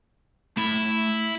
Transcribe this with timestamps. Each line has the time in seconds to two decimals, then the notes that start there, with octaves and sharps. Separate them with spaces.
0.57 A3 E4 B5